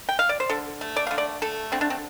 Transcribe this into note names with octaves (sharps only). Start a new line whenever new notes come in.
G5
F5
D5
C5
D3 A4
A3
D5
D3 F5
D5
A3 A4
D3 C4
D4
C4